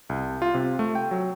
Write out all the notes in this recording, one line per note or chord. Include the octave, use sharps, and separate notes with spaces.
C2
F4
C3
A3
G5
F#3